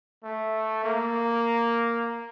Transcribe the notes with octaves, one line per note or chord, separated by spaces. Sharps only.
A3
A#3